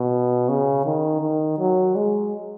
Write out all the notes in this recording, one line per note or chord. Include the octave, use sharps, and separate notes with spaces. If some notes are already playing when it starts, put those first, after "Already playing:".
Already playing: B2
C#3
D#3
D#3
F#3
G#3